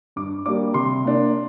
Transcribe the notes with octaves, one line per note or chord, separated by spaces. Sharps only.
G2 D6
G3 A#3 D4 D6
C3 C6
A#3 D4